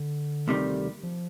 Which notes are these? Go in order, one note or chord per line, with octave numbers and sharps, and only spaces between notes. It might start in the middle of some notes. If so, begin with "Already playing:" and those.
Already playing: D3
D2 C3 D#3 G3
F3